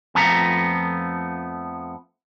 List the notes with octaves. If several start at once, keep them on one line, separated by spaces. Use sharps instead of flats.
F2 F3 A3 B3 A#5